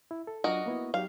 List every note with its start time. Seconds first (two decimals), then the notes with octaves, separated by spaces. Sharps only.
0.11 E4
0.27 A4
0.44 F#3 D4 F4 F#4 A#4 D#5
0.66 A#3 B3 E4
0.94 F#3 D#4 G4 F5